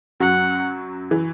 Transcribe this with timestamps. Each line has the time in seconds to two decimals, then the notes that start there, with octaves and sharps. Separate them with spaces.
0.20 F#2 F#3 F#5
1.11 E3